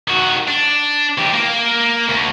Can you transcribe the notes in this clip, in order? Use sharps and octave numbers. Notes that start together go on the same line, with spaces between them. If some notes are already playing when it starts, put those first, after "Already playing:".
D#3 F#4
D4
E3 G4
A#3
D2